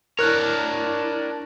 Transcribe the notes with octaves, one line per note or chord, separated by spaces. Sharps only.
D4 E4 A#4 C#5 F#6